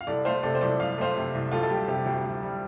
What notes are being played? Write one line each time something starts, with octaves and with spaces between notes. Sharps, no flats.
F5
C2 A4 D5
A3 C5 F5
C3 A4 D5
C5
C2 A4 D5
C2 F5
A3 C5 F5
C3
C2
D2 F4 A4
A4
G3 G4
C3 G4
D2 G4
D2
G3